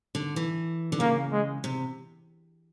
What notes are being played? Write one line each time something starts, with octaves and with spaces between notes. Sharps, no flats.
D3
E3
D3
C#3 A#3
G#3
C3